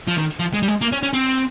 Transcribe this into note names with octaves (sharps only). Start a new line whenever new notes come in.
F3
D#3
F3
G#3
G3
G#3
A#3
C#4
C#4
C4